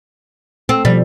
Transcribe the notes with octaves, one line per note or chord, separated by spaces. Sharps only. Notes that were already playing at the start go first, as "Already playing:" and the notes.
C4 A4
B2 F3 G3